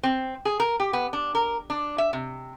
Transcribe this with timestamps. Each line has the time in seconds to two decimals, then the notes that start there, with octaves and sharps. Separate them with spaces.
0.03 C4
0.45 G#4
0.60 A#4
0.80 G4
0.93 B3
1.13 D4
1.35 A#4
1.70 D4
1.98 E5
2.13 C3